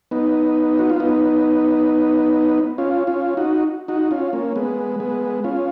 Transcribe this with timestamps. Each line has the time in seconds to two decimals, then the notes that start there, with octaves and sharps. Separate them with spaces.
0.11 B3 D#4
0.79 F#4
0.90 F4
1.00 B3 D#4
2.78 C#4 F4
3.07 C#4 F4
3.37 D#4 F#4
3.88 D#4 F#4
4.11 C#4 F4
4.33 A#3 C#4
4.56 G#3 B3
5.00 G#3 B3
5.44 C#4 F4